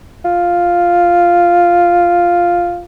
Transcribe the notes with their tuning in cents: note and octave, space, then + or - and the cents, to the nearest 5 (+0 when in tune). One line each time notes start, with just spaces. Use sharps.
F4 +0